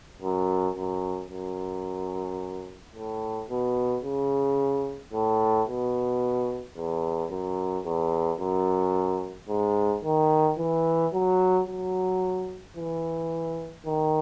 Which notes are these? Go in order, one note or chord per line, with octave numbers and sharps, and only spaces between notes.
F#2
F#2
F#2
A2
B2
C#3
A2
B2
E2
F#2
E2
F#2
G#2
D#3
E3
F#3
F#3
E3
D#3